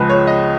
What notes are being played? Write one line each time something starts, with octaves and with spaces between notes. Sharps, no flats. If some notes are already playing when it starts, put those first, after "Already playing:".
Already playing: C#2 C#3 F3 G#3 B4
C#5
D#5